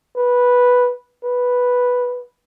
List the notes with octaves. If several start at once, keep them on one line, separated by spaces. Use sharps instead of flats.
B4
B4